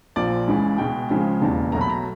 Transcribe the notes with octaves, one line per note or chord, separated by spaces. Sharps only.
A#1 A#2 F3 D5
C#2 C#3 E3 G#3
C#2 B2 G#3 G5
C#2 C#3 F3 G#3
E1 D#2 C#3 E3 A5
B1 B2 F#3 A3 A#5
B5
A#5